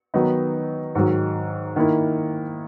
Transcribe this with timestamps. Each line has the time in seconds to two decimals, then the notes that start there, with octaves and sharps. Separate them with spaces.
0.14 D#3 F#3 B3 D#4
0.95 G#2 D#3 F#3
1.76 D#3 A#3 E4